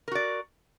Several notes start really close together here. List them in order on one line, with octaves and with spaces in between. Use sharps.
A#4 F#4 D5